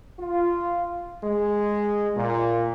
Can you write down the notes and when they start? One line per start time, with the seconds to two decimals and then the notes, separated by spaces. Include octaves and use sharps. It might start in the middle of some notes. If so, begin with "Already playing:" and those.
0.20 F4
1.23 G#3
2.17 A#2